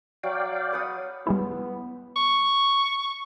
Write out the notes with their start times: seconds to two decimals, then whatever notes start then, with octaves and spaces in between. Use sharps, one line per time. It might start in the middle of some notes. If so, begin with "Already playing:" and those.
0.23 F#3 D5 F5 G5
0.73 B4 F#5 D#6
1.27 G3 G#3 B3 E4
2.17 C#6